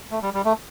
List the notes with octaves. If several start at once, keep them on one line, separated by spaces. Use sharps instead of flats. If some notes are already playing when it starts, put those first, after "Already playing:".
A3
G3
G3
A3